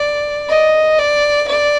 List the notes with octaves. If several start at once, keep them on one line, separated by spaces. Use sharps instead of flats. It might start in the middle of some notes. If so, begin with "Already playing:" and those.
Already playing: D5
D#5
D5
D5